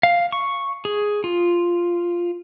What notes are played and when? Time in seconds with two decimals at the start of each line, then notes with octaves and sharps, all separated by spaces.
0.03 F5
0.32 C#6
0.85 G#4
1.24 F4